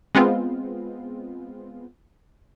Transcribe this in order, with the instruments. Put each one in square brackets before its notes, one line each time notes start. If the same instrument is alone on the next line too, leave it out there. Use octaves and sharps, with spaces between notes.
[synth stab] G#3 B3 C4 F4